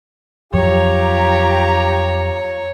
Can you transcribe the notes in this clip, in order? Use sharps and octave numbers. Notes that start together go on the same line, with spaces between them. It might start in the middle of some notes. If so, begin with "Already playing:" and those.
F2 F3 F#3 F4 G4 C#5 A#5